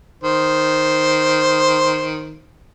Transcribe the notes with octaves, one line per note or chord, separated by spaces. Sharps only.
D#3 C5